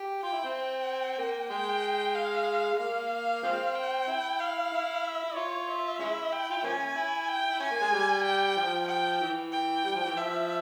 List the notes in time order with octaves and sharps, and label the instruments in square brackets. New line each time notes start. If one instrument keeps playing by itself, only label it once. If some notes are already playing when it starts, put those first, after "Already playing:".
Already playing: [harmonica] G4
[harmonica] F4 [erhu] G5
[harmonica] E4
C4
[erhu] G5
[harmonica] A#3
[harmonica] G#3 [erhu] G5
[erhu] F5
[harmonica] G#3
[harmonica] A#3 [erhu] F5
[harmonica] F3 G#3 C4
[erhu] G5
[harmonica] E4
[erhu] F5
[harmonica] E4
[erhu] E5
[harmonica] E4
[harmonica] F4 [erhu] C#5
[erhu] E5
[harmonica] G#3 C#4 E4
[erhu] G5
[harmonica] F4
E4
[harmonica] F3 A#3 C#4 [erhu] G#5
[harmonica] E4
[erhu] G5
[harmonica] E4
[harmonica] C#4 [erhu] G#5
[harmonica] A#3
G#3
G3
[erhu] G5
[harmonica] F3
[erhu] G5
[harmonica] E3
[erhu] G5
[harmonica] G3
F3
E3
[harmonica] F3 [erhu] E5